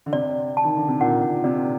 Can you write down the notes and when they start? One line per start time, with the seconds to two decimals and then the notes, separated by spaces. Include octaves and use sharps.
0.06 D3
0.13 C3 D5
0.57 A5
0.64 D#3
0.77 D3
0.88 C3
1.00 A#2 F#5
1.22 A#2
1.44 C3 D5